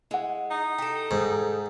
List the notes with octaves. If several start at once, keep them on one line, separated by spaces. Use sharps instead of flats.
G#3 E4 F#5
D#4
G4 A4
G#2